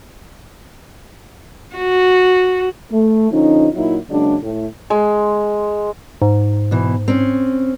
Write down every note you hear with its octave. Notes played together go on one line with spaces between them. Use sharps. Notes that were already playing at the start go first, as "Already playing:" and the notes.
F#4
A3
D3 F3 C#4 D#4
A#2 F#3 D#4 E4
C#3 F#3 G#3 A#3 D4
A2
G#3
G#2
B2 E3
C4 C#4